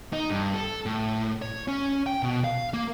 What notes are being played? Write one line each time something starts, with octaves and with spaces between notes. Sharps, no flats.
D#4
G2
A4
A2
C#5
C#4
G5
B2
F5
A#3